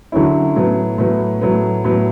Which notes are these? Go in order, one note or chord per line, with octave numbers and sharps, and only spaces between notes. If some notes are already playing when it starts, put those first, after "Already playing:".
D3 F#3 C#4 E4
A2 F#3 B3
A2 F#3 B3
A2 F#3 B3
A2 F#3 B3